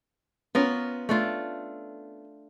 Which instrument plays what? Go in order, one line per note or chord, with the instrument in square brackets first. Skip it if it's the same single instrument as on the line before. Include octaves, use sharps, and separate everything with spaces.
[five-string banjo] B3 C#4 [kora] F4 A#4 F5
[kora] A3 D4 F4